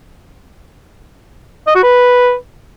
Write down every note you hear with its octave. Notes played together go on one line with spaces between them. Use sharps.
D#5
F#4
B4